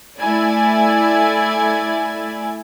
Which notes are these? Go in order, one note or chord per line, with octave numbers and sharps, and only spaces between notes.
A3 E4 D5 G#5